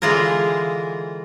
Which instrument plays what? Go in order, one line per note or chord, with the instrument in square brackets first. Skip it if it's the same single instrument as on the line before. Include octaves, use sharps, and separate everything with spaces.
[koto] D3 E3 G#3 F4 G#4 A#4